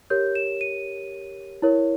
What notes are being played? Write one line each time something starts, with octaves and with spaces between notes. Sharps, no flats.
G4 A#4 C#5 G6
E7
D#7
E4 A#4 C#5